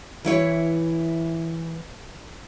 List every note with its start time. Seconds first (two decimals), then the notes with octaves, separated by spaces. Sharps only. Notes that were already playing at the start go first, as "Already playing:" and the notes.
0.25 E3 E4 C#5